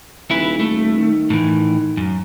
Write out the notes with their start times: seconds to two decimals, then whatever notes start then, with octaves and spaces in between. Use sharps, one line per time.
0.31 D#1 E4 B4
0.60 A3
0.97 D#3
1.30 A2 E3
1.97 F#2